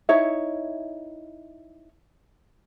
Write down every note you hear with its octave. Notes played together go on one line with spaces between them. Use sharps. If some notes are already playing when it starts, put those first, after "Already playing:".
D#4 E4 C#5 E5